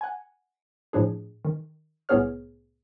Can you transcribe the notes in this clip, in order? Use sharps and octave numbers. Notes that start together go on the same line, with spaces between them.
F#5 G#5
A2 F3 D4 G#4
D#3
C2 A2 B3 G#4 C#5 F6